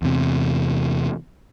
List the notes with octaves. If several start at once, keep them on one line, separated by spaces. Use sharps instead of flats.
E2 C3